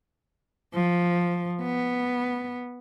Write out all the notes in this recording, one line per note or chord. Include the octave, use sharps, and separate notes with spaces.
F3
B3